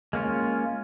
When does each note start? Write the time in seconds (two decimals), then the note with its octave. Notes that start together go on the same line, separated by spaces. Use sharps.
0.13 G#3 A#3 C#4 F4